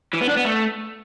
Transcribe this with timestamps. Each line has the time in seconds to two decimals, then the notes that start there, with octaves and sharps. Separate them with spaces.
0.13 E3
0.21 B3
0.29 D4
0.37 B3
0.45 A3